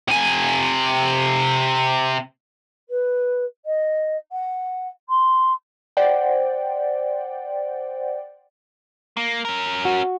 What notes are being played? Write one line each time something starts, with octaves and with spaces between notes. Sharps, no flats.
C3 G#5
B4
D#5
F#5
C6
C5 D5 F#5 G5
A#3
C#4 A#4
F#4